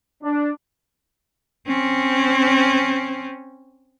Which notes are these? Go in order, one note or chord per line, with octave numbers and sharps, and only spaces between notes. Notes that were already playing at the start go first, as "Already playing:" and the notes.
D4
C4 C#4